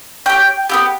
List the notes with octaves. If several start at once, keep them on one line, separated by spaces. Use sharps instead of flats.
C#4 G4 G5
B3 E4 G4